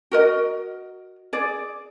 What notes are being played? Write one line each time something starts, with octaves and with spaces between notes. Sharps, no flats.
F#4 A#4 D#5
G#4 D5